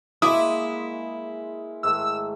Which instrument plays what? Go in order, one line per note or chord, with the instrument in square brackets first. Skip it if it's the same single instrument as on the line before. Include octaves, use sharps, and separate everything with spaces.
[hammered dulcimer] G#3 A#3 [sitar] E4 [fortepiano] D6 D#6
[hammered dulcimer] G#2 D#3 A3 [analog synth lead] E6